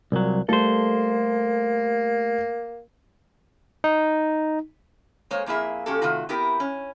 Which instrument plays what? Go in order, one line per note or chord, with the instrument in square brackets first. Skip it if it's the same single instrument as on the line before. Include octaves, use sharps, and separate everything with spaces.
[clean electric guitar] C2 F#3 [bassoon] A#2
[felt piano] G3 A3 [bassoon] A#3 [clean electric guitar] A4 C5
[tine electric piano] D#4
[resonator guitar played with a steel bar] G#3 A#3 G#4 C5 C#5
F2 A#3 E4 G#4 E5
A#2 F3 C#4 F#4 G4 A4
C3 D#3 A3 F4 F#4
B3 C4 E4 G4 A#4
C#4